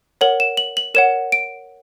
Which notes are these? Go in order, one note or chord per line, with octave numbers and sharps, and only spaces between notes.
A#4 C#5 F#5 F#7
E7
F#7
F#7
A#4 C#5 F#5 E7
D7